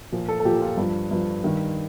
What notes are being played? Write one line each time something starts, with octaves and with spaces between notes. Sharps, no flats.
A#2 F3
A4
A4
A#2 F3 G4
F4
G2 F3
G2 F3
G2 D#3